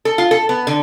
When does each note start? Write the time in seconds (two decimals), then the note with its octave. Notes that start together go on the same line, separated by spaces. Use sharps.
0.05 A4
0.18 F4
0.31 A4
0.49 B3
0.67 D3